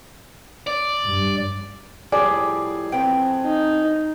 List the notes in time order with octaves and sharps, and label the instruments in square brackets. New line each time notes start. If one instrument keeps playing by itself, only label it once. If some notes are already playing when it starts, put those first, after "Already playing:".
[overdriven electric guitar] D5
[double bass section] G2
[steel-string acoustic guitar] A2 F3 G3 [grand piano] G#4 [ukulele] D5
[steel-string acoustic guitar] F2 B3 C4 [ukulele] G5
[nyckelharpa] D#4